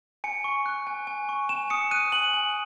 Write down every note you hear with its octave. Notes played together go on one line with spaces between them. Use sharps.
G#5 C#7
C#6
F#6
G#5
G#5
C#6
G#5 E7
D#6 C#7
F#6 D#7
G#5 F#7
G#5